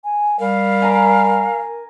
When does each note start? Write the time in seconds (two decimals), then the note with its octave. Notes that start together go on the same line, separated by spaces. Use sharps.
0.04 G#5
0.40 G3 A#4 F5
0.82 G#5 A#5 D6